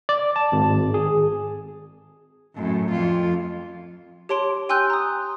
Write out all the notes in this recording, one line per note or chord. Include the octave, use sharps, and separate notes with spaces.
D5
A5
G#1
G#4
F#2 A2
F2 F4
G4 C#5 A5 C6 D7
G5 G#5 C6 E6 F#6 G6
A#5 D#6